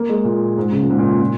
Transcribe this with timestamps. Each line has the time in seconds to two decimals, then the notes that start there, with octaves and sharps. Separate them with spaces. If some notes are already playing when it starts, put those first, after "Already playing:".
Already playing: A#3
0.09 G#3
0.24 A#2
0.57 G#2
0.72 C#3
0.81 A#2
0.90 G#2
0.98 A#2
1.21 A#2